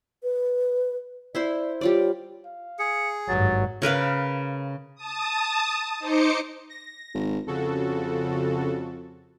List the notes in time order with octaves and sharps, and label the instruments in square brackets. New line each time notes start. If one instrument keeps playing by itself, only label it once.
[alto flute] B4
[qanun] E4 C5 C6 [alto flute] D5
[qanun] G3 F4 D5 [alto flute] C#5
[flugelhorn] F5
[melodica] G#4 [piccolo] C#7
[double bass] G#1 G2 [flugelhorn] F#3 [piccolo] A6
[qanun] C#3 A#4 B4 F5
[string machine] A5 D#6
D#4 C5 D6 C#7
[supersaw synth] A#6
[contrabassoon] G#1
[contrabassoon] F2 [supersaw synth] C#3 F#4 A4